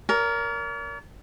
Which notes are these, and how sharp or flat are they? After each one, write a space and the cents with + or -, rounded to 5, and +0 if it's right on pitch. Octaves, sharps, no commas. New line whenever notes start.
A#4 +0 D5 -45